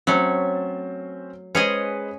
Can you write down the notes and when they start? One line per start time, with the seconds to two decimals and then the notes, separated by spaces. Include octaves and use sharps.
0.07 F#3 A3 C4 C#4 C5
1.55 G#3 C#4 G#4 B4 C5 D#5